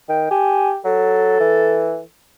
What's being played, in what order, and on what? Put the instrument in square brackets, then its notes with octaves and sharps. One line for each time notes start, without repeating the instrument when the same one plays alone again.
[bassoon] D#3 [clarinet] G5
[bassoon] G4 [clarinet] G#5
[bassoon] F#3 [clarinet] A4
[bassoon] E3